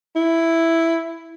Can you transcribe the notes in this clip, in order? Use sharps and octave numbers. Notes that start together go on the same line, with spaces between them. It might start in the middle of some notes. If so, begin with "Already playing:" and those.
E4